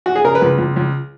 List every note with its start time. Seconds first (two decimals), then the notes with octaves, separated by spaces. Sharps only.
0.06 F#4
0.16 G#4
0.24 C#3 A#4
0.35 B4
0.42 C#2
0.58 C#2
0.76 C#2